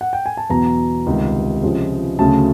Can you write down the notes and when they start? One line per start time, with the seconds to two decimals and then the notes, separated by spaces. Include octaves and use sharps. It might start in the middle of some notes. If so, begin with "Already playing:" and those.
0.01 F#5
0.13 G5
0.26 G#5
0.37 A5
0.50 E2 B2 F#3 B3 A#5
1.06 C#2 C3 D#3 G3
1.62 C#2 C3 F3 G#3 C#4
2.19 D2 C#3 F#3 A3 C#4 A5